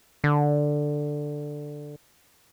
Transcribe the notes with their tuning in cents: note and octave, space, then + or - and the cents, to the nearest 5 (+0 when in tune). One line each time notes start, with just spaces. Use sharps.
D3 +5